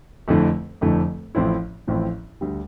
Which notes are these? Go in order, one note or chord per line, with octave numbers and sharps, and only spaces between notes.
F1 F2 D3 A3 E4
F1 F2 D3 A3 E4
A1 A2 F3 C4 E4
A1 A2 F3 C4 E4
D2 D3 G3